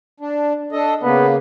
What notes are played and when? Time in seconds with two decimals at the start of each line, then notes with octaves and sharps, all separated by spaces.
0.20 D4
0.72 D4 A4 D#5
1.03 C#3 A#3 B3